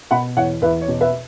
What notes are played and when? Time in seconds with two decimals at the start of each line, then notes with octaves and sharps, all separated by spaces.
0.11 B2 F#5 B5
0.37 E2 C#5 F#5
0.62 E2 B4 E5
0.82 C#5
0.88 B2
1.01 B4 E5